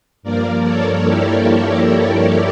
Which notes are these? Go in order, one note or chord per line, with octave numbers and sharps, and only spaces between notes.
G2 F3 A#3 A#4 D5
A4 C#5
E4 G4